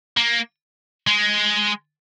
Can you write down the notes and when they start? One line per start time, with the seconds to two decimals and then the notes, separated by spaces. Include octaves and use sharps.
0.17 A#3
1.07 G#3